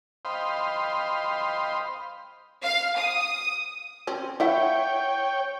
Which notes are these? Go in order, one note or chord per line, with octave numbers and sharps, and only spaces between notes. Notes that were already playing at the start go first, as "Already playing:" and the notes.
C5 D#5 F5 G5 B5 C6
F5
D#6
C4 C#4
E4 C#5 E5 F#5 G5